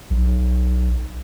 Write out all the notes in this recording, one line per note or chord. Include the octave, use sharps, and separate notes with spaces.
B1